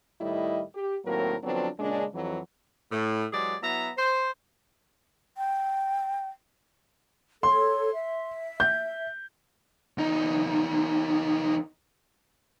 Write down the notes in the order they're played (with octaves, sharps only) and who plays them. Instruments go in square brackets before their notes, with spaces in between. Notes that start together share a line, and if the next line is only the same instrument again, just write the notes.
[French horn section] A2 D#3 G3 E4 D#5
G4
D#2 A2 F#3 A#3 C4 A#4
D3 F3 F#3 B3 C4 D4
A#2 C#3 G#3 C#4 D4
F2 E3 F#3
[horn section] A2
E3 F#3 G#3 G4 G#4 D5
F#3 B3 E4 E5 A#5
C5
[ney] G5
[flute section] A4 C#5 [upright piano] C6
[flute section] E5
[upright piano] G6
[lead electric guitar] E2 D#4